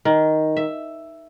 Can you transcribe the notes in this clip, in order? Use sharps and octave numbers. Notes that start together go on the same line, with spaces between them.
D#3
E5